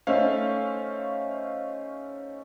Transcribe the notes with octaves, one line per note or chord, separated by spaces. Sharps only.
A3 C#4 D#4 C5 E5 F5